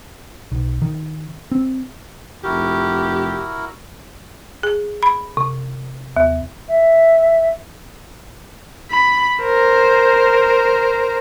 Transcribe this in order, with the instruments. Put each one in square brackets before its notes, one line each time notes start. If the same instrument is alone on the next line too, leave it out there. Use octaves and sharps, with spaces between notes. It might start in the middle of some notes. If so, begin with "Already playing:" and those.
[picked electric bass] B1
D#3
C4
[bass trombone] F1 [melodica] E4 F#4 A#4 [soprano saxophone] G4
[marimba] G#4
B5
C3
D#2
[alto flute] E5
[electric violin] B5
A#4 C5